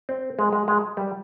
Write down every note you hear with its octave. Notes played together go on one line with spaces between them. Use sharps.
C4
G#3
G#3
G#3
G3